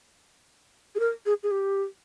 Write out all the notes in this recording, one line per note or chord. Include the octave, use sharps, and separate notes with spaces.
G#4
A#4
G#4
G#4
G4